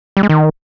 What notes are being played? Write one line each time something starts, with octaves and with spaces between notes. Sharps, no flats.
G3
G#3
D#3